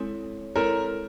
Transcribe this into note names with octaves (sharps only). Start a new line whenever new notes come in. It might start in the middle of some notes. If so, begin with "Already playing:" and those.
Already playing: G#3 C4 E4 A4 C#5
G#3 C4 E4 A4 A#4 C#5